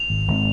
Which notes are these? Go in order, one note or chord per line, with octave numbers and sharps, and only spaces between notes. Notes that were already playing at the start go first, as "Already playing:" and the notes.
Already playing: F7
G#1
G#1